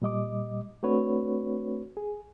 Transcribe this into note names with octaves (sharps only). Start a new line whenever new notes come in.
A#2 G3 D#5 D6
A3 C4 D4 F#4 B4 C#5
G#4